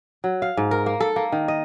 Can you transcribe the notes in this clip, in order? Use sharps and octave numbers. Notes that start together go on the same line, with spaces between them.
F#3
F5
G#2
A#4
A#3
A4
A#3
D#3
D#5